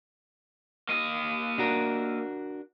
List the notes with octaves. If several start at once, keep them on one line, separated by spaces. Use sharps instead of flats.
A#3 D#5
D4 F#4 A#4